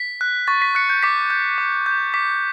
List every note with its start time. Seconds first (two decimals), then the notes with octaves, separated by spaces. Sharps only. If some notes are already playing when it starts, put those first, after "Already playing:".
Already playing: B6
0.21 F#6
0.47 C#6 A6
0.62 B6
0.75 F#6 C#7
0.90 G6
1.02 D6 B6
1.30 G6
1.58 D6
1.86 G6
2.14 D6 B6